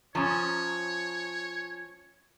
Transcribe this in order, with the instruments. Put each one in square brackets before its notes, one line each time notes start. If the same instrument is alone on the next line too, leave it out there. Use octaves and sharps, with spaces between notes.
[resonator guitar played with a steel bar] F3 C#4 [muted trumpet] C#5 [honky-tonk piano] A#5 C#6 D#6